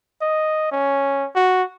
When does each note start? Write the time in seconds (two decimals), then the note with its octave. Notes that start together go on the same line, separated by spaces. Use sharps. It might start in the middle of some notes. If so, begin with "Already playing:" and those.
0.21 D#5
0.72 C#4
1.36 F#4